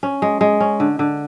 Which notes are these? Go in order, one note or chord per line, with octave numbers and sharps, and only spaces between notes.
C#4
G#3
G#3
C#4
D3
D3